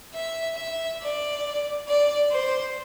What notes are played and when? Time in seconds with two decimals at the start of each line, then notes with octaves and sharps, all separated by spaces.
0.13 E5
0.57 E5
1.01 D5
1.87 D5
2.31 C5